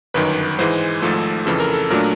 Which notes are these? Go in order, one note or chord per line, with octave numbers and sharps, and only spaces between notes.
G1 F#2 D#3 B4
G#2 E3 G#3 C5
G#1 G#2 F3 A3 A4
F2 C#3 E3 A4
A#4
A4
A#2 F#3 A3 D4 A#4